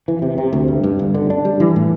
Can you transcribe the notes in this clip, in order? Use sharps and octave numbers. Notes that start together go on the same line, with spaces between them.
E3
C3
C3
D2
G2
G2
G1
D3
D4
G3
E3
A2